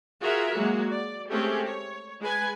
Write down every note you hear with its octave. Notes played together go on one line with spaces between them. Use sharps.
F4 F#4 G#4 A#4 E5
F#3 G#3 A#3 F#4
D5
G#3 A3 C4 C#4 G4 G#4
C#5
G#3 B4 G#5